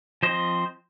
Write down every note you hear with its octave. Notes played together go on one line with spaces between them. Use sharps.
F3 C4 C5 D#5